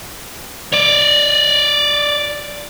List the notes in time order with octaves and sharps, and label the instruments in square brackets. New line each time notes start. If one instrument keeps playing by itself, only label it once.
[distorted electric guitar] C#5 D5